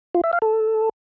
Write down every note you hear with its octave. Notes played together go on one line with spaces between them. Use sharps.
F4
E5
F5
A4